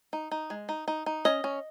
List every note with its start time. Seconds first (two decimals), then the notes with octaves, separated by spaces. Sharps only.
0.13 D#4
0.31 D#4
0.50 G#3
0.69 D#4
0.88 D#4
1.06 D#4
1.25 C#4 D#5
1.44 C#4